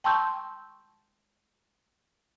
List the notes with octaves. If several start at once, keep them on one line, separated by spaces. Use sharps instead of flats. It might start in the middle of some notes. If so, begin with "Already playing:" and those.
G5 A5 C6 C#6 E6 G6